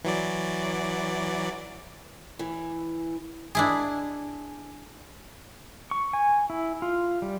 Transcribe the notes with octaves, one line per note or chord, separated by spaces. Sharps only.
E3 F#3 D5
E3
D4 E4 G#4
C#6
G#5
E4
F4
G3